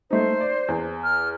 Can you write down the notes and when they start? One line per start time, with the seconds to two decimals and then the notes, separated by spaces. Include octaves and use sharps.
0.11 A3 D#4 C5
0.40 D5
0.68 E2
1.04 F6